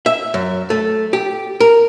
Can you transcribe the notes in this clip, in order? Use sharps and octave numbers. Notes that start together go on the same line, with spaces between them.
E5
F#2
A3
G4
A#4